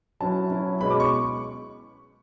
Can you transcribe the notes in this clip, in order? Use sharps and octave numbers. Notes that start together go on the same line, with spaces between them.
F#3 C#4 E4 A5
F#3 C#4 E4
B2 G#3 C#4 B5
D6
C#6